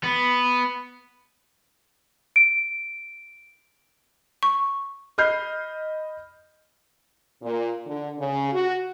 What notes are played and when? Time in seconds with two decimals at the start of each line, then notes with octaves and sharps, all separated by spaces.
0.04 B3
2.36 D7
4.43 C#6
5.18 D#5 B5 F6 G6 C7
7.42 A#2
7.87 D3
8.18 C#3
8.52 F#4